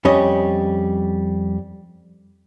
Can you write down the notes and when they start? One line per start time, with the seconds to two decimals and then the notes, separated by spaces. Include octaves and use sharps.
0.05 F2 G3 C#4 D#5